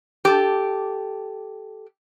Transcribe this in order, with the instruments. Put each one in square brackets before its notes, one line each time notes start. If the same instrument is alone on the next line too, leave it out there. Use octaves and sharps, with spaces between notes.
[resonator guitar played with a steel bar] G4 A4